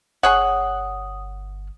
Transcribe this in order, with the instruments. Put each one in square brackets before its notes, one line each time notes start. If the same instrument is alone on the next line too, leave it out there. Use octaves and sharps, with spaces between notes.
[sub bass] G1 [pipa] G#4 C#5 F#5 [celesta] D#6